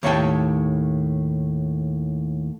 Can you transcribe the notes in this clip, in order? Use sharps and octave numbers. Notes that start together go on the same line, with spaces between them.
D#2 A2 C#5 D#5 G5 A5